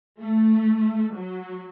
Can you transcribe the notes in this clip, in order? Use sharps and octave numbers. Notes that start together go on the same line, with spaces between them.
A3
F#3